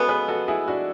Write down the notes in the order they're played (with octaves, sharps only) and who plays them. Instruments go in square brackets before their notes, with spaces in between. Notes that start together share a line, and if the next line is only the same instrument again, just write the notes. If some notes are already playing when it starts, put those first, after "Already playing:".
Already playing: [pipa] C#3 G#3 B3 [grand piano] F#4 A4
[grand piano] G#4 B4
F#4 A4
E4 G#4
D4 F#4